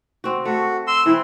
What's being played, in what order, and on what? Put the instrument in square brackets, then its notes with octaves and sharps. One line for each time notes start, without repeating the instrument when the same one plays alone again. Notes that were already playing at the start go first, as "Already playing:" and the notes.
[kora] C4 F#4
[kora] A3 [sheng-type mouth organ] F#4
[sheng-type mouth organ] C6 E6
[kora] E3 C4 [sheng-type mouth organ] E4